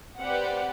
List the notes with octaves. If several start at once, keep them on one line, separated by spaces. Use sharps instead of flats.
C4 G4 B4 D5 F#5